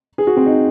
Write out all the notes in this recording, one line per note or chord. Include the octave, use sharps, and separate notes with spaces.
G#4
F#4
C4
D#4